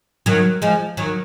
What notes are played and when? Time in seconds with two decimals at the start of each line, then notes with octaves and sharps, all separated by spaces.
0.26 D#3 F#3
0.62 F3 G#3
0.97 D#3 F#3